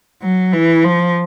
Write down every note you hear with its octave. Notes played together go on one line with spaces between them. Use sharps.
F#3
E3
F3